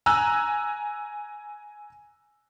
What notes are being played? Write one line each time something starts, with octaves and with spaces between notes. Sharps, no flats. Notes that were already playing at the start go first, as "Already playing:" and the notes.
G#5 A#5 E6 F#6